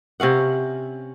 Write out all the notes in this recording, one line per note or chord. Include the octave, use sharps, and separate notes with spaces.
C3 C#4 F5 F#5